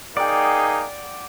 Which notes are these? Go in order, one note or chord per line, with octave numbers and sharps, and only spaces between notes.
A#3 D#4 G#4 D5 F#5 G5